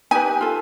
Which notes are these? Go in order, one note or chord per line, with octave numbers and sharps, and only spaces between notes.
D#4 G4 B4 G#5
F4 A4